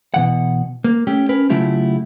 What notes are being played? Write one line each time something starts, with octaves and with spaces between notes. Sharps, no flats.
B2 E3 F#5
A#3
A3 C#4 G4
C#4 A#4 B4
C#3 F#3 A3 E4 F4 G4